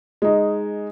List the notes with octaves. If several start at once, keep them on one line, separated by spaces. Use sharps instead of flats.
G#3 D#4